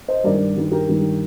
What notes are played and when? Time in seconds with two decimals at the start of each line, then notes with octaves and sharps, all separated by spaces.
0.08 C5 D#5
0.24 G2 D#3 G3 A#4 D5
0.56 G2 D#3 G3
0.72 G4 A#4
0.89 G2 D#3 G3